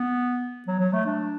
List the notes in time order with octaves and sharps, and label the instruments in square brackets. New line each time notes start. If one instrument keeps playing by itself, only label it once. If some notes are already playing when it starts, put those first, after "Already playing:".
Already playing: [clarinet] B3
F#3
F#3
A3
D4